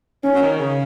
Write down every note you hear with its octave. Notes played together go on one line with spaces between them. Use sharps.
C#4
F#3
D#3
C#3